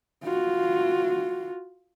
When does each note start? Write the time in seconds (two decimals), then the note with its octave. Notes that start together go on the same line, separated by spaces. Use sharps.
0.24 F4 F#4